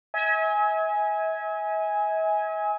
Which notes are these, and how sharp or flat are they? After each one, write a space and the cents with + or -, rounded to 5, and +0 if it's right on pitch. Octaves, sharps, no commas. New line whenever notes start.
E5 -45 G#5 +0